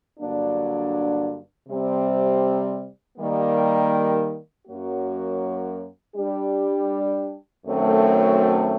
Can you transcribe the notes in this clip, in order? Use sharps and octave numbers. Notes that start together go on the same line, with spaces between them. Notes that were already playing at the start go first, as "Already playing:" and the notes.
G2 D3 F#3 A#3 D4
C3 G3 C4
D#3 G3 A#3
F#2 F#3 A#3 F#4
G3 D4 G4
F#2 D#3 F#3 A3 C4